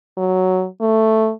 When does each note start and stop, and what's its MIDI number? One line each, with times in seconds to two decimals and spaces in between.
0.17 0.66 54
0.81 1.31 57